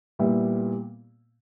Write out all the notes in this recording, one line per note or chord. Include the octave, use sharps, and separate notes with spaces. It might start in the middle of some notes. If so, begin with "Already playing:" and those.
A#2 G3 B3 E4